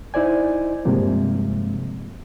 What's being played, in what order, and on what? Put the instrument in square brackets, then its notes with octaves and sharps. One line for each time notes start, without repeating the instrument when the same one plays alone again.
[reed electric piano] D#4 E4 C5 D5 G#5
G2 C3 F3 G#3 A#3